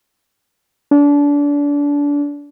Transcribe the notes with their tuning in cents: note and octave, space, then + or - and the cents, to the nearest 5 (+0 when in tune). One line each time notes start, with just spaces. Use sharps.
D4 -30